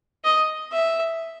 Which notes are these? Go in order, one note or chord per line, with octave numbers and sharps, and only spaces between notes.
D#5
E5